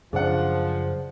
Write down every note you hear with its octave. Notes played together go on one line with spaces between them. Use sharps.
F#2 C#3 F3 D4 G#4 C5 F#5